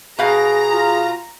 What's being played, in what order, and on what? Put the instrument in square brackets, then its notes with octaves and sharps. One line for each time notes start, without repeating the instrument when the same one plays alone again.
[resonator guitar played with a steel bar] B2 F5 [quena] G#4 [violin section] A#5
[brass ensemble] F4